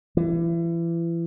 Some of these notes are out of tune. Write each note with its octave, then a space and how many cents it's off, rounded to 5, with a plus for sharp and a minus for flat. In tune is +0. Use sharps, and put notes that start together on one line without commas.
E3 +30